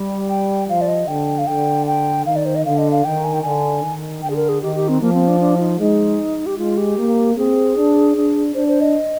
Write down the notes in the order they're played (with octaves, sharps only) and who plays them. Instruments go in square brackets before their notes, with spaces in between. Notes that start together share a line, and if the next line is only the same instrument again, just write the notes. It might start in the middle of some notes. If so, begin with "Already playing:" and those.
Already playing: [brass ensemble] G3
[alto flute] G5
[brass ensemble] F3 [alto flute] F5
[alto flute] D5
D#5
[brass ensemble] D3 [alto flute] G5
[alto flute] F5
[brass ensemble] D3 [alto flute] G5
[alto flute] G5
[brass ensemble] D#3 [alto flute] F5
[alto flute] D5
C5
D#5
[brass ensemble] D3 [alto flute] F5
[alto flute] D#5
F5
[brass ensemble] D#3 [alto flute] G5
[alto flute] G#5
G5
[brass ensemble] D3 [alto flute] G#5
[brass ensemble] D#3
[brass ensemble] D3 [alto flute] G5
[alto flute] G#4
A#4
G#4
[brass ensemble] D#3 [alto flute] G4
[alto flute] G4
C4
[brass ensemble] F3 [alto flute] A#3
[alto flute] C4
D4
D4
F4
D#4
[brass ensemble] G#3 [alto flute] D#4
[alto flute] G4
[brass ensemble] G#3 [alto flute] F4
[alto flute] G4
[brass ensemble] A#3
[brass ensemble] C4 [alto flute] G#4
[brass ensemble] D4
D4
[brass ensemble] D4 [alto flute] C5
[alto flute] C5
D#5